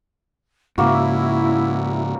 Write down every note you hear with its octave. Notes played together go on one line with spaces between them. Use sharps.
G#2 C#3 A#3 E4 F#4